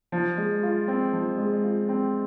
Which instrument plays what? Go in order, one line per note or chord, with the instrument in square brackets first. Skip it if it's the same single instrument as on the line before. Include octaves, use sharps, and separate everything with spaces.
[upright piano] F3
G#3
F4
C4
F3
G#3
F4
C4